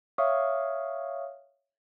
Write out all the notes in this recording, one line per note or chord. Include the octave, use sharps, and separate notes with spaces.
C#5 E5 F5 C#6 D#6 F6